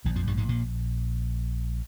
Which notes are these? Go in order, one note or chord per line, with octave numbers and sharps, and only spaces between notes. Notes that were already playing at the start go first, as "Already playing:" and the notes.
A#1 A#2 D#3
F2 F3
G2 G3
G#2 G#3
A#2 A#3